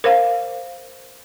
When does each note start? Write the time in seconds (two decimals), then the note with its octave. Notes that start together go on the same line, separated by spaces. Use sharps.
0.04 A#4 C5 F5